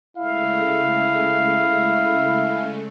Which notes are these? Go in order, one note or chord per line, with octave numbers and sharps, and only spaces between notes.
C#3 G#3 A3 E4 F5